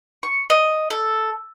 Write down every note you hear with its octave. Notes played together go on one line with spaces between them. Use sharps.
C#6
D#5
A4